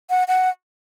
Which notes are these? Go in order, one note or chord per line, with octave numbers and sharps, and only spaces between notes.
F#5
F#5